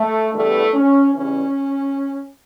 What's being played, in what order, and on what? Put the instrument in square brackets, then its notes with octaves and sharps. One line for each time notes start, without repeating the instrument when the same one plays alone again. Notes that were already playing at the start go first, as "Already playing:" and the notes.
Already playing: [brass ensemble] A3
E2 D3 G3 A3
C#4
E2 C#3 E3 G3 C#4